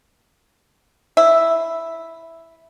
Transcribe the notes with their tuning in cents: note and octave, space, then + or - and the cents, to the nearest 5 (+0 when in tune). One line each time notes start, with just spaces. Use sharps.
E4 +0 E5 +0